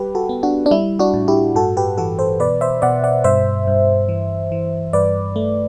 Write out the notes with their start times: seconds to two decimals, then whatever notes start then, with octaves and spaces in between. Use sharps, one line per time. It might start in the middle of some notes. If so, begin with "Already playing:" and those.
Already playing: G3 G4 B4
0.15 F#4 A4
0.29 B3
0.43 D4 F#4
0.66 D4
0.71 G3 E4
0.99 D4 F#4
1.14 A2
1.28 E4 G4
1.55 G2 F#4 A4
1.77 G4 B4
1.98 E3 F#4 A4
2.19 A4 C5
2.40 B2 B4 D5
2.61 C5 E5
2.82 B2 D5 F#5
3.04 D5 F#5
3.24 G2 C5 E5
3.67 G2
4.09 E3
4.52 E3
4.93 G2 B4 D5
5.36 A3